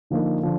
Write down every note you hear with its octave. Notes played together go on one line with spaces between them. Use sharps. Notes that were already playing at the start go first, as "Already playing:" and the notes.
D3 F3 A#3 D#4
D3 F3